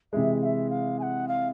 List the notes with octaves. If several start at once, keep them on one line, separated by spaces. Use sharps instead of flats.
C3 E3 G#3 E5
F5
E5
F5
G#5
F#5
F5